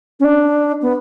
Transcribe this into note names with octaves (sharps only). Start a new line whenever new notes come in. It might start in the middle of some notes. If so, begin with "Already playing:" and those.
C#4
D4
B3